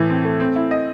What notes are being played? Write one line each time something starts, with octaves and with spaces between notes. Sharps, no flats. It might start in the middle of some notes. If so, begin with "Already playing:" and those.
Already playing: A2 E3
C4
A3
C4
E4
D#5